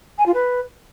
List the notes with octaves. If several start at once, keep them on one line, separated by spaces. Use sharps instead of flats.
G#5
F4
B4